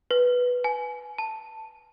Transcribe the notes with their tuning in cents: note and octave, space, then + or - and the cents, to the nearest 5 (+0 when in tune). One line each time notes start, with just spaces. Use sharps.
B4 -5
G#5 +25
A5 +0